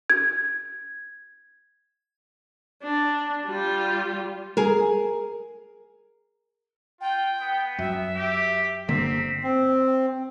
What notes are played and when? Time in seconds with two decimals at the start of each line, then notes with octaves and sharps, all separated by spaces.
0.10 G#6
2.83 D4
3.47 G3 F4
4.57 G#4 A#4
7.01 F4 G5
7.41 B3
7.78 F#2 E5
8.16 G4
8.88 G1 D3 A#3 C4 B6
9.43 C4